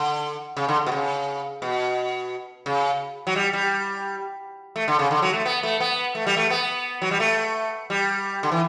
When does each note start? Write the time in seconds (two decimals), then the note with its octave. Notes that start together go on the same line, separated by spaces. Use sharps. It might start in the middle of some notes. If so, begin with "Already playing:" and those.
Already playing: D3
0.57 C#3
0.68 D3
0.86 B2
0.92 C#3
1.62 B2
2.66 C#3
3.27 F#3
3.36 G3
3.53 G3
4.76 A3
4.88 D3
4.99 C#3
5.11 D3
5.22 F#3
5.34 A3
5.46 B3
5.63 A3
5.80 B3
6.15 A3
6.27 G3
6.37 A3
6.50 B3
7.02 F#3
7.11 G3
7.20 A3
7.90 G3
8.43 D3
8.51 E3